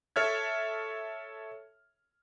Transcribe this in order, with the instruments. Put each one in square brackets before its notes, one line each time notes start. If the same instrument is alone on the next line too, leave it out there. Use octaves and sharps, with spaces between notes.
[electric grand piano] A4 C#5 E5 F6 G#6